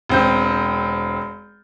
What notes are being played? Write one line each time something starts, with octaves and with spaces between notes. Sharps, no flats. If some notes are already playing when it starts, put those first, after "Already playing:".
E1 C4 G6